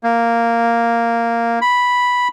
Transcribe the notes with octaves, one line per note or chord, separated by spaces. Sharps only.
A#3
B5